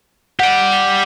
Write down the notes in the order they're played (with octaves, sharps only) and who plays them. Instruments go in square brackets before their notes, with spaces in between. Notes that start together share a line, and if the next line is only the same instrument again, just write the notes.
[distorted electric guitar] G4 D5 [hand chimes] F#5